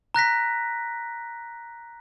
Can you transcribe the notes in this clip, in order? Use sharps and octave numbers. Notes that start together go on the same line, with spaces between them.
A#5 F#6 A#6 B6